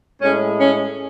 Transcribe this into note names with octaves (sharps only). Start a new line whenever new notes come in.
A2 G#3 C#4
C#4